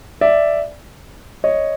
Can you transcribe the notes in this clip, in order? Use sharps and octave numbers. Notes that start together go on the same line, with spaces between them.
D5 E5
C#5 D#5